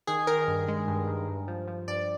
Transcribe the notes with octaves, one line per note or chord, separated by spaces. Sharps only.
D#3 G#4
D#3 A#4
G2
G#3
G2
G2
G2
F3
F3
G2 D5